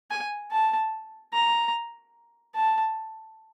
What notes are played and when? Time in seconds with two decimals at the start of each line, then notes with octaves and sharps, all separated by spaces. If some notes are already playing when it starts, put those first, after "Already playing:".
0.11 G#5
0.51 A5
1.34 A#5
2.55 A5